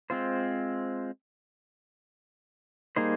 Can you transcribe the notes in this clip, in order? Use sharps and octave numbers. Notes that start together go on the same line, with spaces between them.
G#3 C4 F4 C5
G3 A#3 D#4 G#4 C5